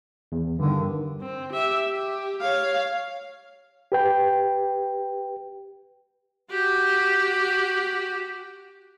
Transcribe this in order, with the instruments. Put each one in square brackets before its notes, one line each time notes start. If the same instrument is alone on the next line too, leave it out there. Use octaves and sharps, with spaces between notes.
[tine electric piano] E2
[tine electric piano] G2 D#3 [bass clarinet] D3
[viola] C4
G4 E5
G4
C#5 F5
[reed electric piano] G4 B4 G5
[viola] F#4 G4